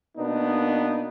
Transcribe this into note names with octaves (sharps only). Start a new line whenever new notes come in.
B2 A#3 B3 D4 D#4